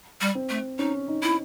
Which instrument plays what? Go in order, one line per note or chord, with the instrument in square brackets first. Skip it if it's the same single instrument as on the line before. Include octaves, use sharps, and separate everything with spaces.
[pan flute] G3
[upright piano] C4
[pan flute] A3
[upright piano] C#4 [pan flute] D#4
[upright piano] D#4
[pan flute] E4